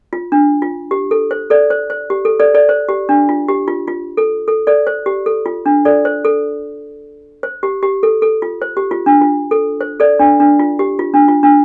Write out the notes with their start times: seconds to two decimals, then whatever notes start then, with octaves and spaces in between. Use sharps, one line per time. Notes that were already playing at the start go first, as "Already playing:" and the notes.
0.13 F4
0.32 D4
0.62 F4
0.91 G4
1.11 A4
1.31 C5
1.50 A4 D5
1.70 C5
1.90 C5
2.10 G4
2.25 A4
2.40 A4 D5
2.54 A4 D5
2.69 C5
2.89 G4
3.09 D4
3.29 F4
3.48 G4
3.68 F4
3.88 F4
4.17 A4
4.48 A4
4.67 A4 D5
4.87 C5
5.06 G4
5.26 A4
5.46 F4
5.66 D4
5.85 A4 D5
6.05 C5
6.25 A4
7.43 C5
7.63 G4
7.83 G4
8.03 A4
8.22 A4
8.42 F4
8.62 C5
8.77 G4
8.91 F4
9.06 D4
9.21 F4
9.51 A4
9.81 C5
10.00 A4 D5
10.19 D4
10.40 D4
10.59 F4
10.79 G4
10.99 F4
11.14 D4
11.28 F4
11.43 D4